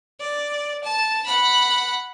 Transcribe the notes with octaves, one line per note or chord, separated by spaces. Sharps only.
D5
A5
F#5 B5